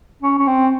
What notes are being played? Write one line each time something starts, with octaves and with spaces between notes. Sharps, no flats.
C#4
C#4
C4